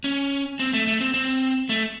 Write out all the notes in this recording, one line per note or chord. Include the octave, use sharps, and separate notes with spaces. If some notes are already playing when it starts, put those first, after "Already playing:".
C#4
C4
A3
A3
C4
C4
A3